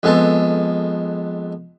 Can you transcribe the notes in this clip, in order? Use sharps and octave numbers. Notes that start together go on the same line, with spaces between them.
F2 G#3 B3 A4